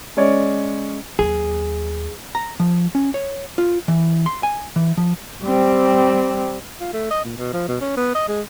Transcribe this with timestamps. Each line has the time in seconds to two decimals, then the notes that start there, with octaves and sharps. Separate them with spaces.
0.17 G#3 C#4 C#5 D5
1.19 D#2 F#3 G#4
2.35 A#5
2.60 F3
2.95 C#4
3.14 C#5
3.58 F4
3.88 E3
4.26 C6
4.43 G#5
4.76 E3
4.97 F3
5.43 G3 C4
6.80 F4
6.93 A3
7.11 D#5
7.25 A#2
7.38 B2
7.53 F3
7.68 B2
7.81 C#4
7.97 B3
8.15 D#5
8.28 G#3